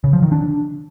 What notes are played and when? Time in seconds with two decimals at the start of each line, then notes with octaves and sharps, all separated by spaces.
0.04 C#3
0.13 F3
0.23 D#3
0.32 D4